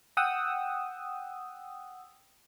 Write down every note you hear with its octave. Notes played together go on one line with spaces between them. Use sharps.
F#5 G5 D#6 E6